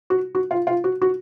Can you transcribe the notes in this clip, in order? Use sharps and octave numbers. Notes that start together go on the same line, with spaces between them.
F#4
F#4
F4
F4
F#4
F#4